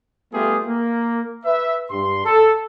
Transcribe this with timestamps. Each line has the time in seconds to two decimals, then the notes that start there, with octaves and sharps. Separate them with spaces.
0.33 G3 A3 B3 F4 G4 G#4
0.66 A#3
1.45 B4 E5
1.90 G2 C6
2.25 A4